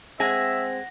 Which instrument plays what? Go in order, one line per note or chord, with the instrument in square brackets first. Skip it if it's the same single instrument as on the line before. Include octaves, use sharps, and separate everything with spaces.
[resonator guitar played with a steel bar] G#3 G#5 [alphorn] C4 [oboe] E5 [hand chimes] F#5 A#6